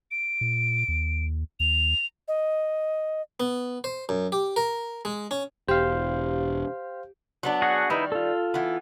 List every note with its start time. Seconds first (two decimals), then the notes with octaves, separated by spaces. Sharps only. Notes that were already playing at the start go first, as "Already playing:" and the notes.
0.11 D7
0.41 A#2
0.88 D#2
1.60 D#2 F7
2.28 D#5
3.40 B3
3.84 C5
4.09 F#2
4.32 G4
4.56 A#4
5.05 G#3
5.31 C#4
5.68 E1 G4 C5 F5
7.43 F#3 B3 D4
7.62 F#4 G#4 F#5
7.90 D#3 G3 D#4 E4 B4
8.12 F4 A4
8.54 E3 B3